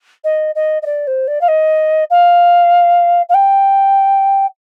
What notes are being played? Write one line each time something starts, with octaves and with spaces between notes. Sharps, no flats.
D#5
D#5
D#5
D5
C5
D5
F5
D#5
F5
F5
G5